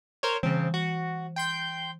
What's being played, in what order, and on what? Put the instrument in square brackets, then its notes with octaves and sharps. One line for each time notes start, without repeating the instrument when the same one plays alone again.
[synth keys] A#4 C5 C#5
[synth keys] C#3 C4 [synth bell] E3
[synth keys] F#4
G5 C6 G6